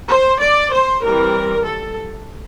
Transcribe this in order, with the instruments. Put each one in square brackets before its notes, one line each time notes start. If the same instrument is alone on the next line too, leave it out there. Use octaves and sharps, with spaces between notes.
[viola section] C5
D5
C5
E3 G3 C4 A#4
A4